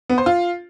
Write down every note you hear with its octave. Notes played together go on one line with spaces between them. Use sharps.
B3
C5
F4